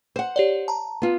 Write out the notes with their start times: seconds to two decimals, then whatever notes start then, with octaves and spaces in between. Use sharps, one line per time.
0.16 C5 F#5
0.36 G4 C#5 D5
0.68 A5 A#5
1.02 B3 F4